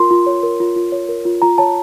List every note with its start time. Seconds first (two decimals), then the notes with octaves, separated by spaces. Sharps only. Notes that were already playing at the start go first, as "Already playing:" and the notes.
Already playing: F4 A#4 C6
0.11 F4
0.27 C#5
0.43 A#4
0.60 F4
0.76 F4
0.92 C#5
1.09 A#4
1.25 F4
1.42 F4 A#5
1.58 C#5 A5